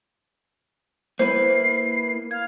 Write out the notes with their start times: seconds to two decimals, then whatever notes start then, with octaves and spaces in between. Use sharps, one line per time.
1.19 A#3 E4 B4 C5 C7
2.31 F5 G#6